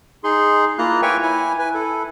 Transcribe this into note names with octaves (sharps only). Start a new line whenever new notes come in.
D#4 G#4 C6
A#3 E4 F4 A#5 F#6
B4 C#5 E5 G5 G#5 C#6
E4 G#5
B4 G#5
E4 A4